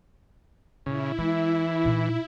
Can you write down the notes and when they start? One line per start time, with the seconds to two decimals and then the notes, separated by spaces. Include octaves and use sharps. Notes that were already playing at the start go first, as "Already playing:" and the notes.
0.86 A#2 C#3 E4
1.18 E3 G#3
1.85 A#2 D#4